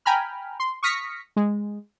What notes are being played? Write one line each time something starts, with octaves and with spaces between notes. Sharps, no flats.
G5 G#5 A#5 B5 F6
C6
C#6 D#6 F6 A#6 B6 C#7
G#3